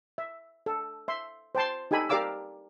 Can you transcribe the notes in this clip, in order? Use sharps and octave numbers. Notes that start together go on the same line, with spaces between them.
E5
A4
E5 C6
C5 G5 A5 C6
D#4 G4 A4 G#5 B5
G4 A#4 D5 F5 D6 E6